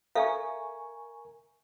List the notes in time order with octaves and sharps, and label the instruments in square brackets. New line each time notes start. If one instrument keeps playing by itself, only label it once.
[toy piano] A4 E5 F5 [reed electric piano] A#4 G#5 C#6